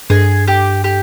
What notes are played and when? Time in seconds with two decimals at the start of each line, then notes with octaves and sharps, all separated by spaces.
0.10 G2 G#4
0.48 G4
0.84 G4